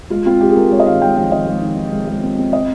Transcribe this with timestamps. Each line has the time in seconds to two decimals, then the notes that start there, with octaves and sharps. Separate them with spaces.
0.10 G#3 F4
0.26 C4 F4
0.41 G#3 G4
0.49 G#4
0.56 G#3 A#4
0.71 G#3 C#5
0.80 D#5
0.86 D#3 F5
1.01 G#3 G5
1.16 F2 F5
1.31 D#3 D#5
1.47 G#3
1.62 D#3
1.77 D#3
1.92 G#3
2.07 G#3
2.23 C4
2.38 C4
2.53 D#5